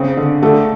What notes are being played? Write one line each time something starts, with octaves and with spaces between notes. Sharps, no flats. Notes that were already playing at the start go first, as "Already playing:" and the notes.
Already playing: C#3 C4
D3
D3 A3